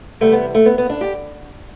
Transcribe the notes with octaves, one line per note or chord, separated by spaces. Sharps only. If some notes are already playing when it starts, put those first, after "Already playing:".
E2 C3 G3 A3
B3
A3
B3
B3
D4
G4